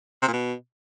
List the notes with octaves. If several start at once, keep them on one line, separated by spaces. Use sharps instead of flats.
C3
A#2
B2